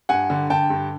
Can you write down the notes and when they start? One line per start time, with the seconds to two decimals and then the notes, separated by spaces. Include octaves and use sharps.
0.09 G2 F#5 G#5
0.30 D3
0.50 D3 G5 A5
0.70 G2